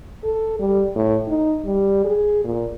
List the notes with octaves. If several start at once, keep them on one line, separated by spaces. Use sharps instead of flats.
A4
G3
A2
D#4
G3
G#4
A#2